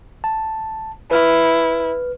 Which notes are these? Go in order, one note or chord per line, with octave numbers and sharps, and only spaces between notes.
A5
E4 B4 F6